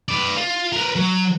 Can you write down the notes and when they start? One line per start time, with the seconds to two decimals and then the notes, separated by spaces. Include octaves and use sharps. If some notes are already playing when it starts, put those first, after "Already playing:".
0.09 B4 D5
0.36 F4
0.73 A#4 B4
0.96 F#3